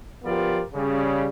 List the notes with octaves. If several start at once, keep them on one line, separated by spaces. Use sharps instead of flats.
F3 B3 F4 G4 A#4 D5
C#3 G3